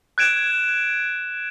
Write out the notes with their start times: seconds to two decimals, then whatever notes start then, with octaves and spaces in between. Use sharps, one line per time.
0.18 F#6 G#6 D7 E7